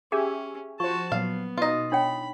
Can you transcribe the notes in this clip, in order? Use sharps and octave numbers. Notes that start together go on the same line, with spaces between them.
C#4 G4 G#4 E5 G#5
F3 F#4 C5 A5 C#6
A#2 F#3 B3 F5
B2 D#4 F4 D#5
D4 C#5 G5 B5